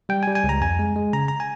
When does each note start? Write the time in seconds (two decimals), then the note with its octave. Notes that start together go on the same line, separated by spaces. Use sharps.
0.09 G3 G5
0.23 G#5
0.27 G3
0.35 G#5
0.44 C#2
0.49 A#5
0.61 F2 G#5
0.79 G#3
0.96 G#3
1.13 C#3 A#5
1.28 A#5
1.40 G#5